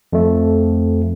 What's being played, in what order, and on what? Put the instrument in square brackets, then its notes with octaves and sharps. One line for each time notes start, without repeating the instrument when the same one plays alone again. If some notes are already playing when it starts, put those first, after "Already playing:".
[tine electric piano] F2 A3